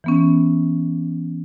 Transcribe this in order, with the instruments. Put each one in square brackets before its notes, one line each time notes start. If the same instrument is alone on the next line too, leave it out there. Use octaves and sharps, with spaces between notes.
[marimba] E3 B3 C#4